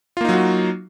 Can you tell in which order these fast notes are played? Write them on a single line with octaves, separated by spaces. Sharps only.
F4 A#3 D#4 F#3 F#4